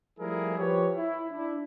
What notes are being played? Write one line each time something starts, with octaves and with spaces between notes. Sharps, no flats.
F3 G3 A3 E4 G#4 A#4
F3 G4 B4 C#5
E4
D4 E4